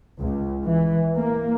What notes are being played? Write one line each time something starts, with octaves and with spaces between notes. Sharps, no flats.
C#2
E3
A#3